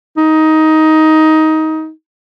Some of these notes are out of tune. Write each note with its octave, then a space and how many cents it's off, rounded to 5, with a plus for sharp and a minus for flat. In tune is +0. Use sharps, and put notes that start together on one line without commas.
D#4 +15